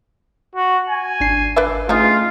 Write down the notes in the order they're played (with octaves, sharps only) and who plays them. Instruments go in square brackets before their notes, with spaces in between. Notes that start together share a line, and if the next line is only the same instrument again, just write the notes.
[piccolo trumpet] F#4
G#5
[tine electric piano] G#1 D4 C7
[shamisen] B4 D5 E5
[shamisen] C#3 D#4 G#4 [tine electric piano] A3 [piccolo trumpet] F4